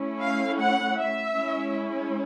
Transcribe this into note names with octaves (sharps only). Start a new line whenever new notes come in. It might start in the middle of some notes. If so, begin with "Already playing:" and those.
Already playing: A3 C#4 E4
F5
F#5
E5
G#3 C#4 E4